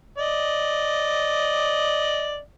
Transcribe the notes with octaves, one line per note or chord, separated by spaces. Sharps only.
D5 D#5